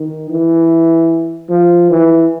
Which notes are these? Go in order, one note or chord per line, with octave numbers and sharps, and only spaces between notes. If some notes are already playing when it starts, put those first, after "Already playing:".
Already playing: D#3
E3
F3
E3